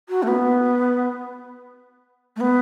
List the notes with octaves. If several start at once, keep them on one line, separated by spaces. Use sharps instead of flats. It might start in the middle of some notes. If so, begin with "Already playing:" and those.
F#4
A3
B3
A3
B3